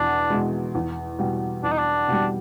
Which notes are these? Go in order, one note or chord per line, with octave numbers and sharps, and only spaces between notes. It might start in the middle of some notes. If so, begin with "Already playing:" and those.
Already playing: E2 B2 D4
B2 G#3
E2
B2 G3
E2 D4
D#4
D4
B2 G3